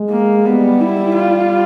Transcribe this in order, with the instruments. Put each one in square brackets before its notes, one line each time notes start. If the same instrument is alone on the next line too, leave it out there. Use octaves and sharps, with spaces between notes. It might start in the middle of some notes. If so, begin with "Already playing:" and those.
Already playing: [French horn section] G#3
[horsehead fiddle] A#3
[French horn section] G3 [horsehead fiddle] B3
[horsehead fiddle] E4
F4